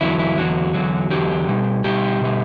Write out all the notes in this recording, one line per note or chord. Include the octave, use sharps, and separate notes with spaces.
E2 D3 F#3 E4
E4
E2 D3 F#3 F#4
E2 D3 F#3
E2 D3 F#3 G4
B2 G3
B2 G3 G4
B2 G3